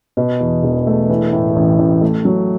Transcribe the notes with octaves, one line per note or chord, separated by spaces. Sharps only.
B2
E2
E1
A3
E3
A2
A1
A1
A3
F#3